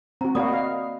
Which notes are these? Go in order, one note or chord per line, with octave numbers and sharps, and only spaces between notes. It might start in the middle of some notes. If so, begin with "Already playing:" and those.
C4 F#4 A#5
A#3 F#4 D5 F5 B5 D#6
D#5 F5